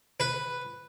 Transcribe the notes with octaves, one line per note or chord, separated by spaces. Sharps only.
B4